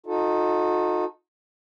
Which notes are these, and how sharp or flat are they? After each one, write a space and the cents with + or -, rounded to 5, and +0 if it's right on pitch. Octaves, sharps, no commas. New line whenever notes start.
D#4 +0 F#4 -45 A4 -5